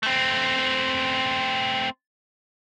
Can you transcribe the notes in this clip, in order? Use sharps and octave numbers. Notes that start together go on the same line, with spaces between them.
A3 C4